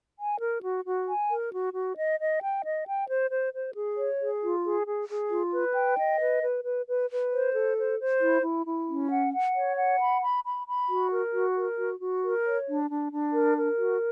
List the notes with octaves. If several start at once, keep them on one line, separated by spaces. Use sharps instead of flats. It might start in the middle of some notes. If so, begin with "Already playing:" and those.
G#5
A#4
F#4
F#4
G#5
A#4
F#4
F#4
D#5
D#5
G5
D#5
G5
C5
C5
C5
G#4
C#5
G#4
F4
G#4
G#4
G#4
F4
B4
G5
D#5
B4
B4
B4
B4
B4
C5
A4
C5
C5
E4
E4
E4
C#4
F#5
F#5
C#5
F#5
B5
B5
B5
B5
F#4
A#4
F#4
A#4
F#4
F#4
A#4
C#5
D4
D4
D4
A#4
A#4
F#4